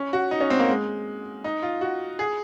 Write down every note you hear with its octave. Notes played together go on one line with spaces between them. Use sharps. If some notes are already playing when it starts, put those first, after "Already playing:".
Already playing: C#4
F#4
D#4
C#4
C4
A#3
G#3
D#4
F4
F#4
G#4